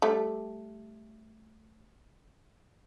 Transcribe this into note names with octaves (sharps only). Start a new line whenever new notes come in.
G3 A3